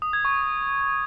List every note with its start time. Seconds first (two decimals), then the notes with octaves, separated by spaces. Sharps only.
0.02 D#6
0.13 G#6
0.25 C#6